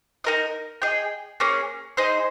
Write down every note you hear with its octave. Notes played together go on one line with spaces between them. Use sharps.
D#4 A#4 D#5
G#4 D#5 G5
A#3 C#4 G#4
D#4 G#4 C5 D#5